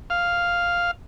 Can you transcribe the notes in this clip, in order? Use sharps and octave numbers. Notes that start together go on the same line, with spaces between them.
F5